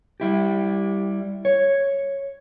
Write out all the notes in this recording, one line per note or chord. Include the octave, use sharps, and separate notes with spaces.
G3 E4 G4
C#5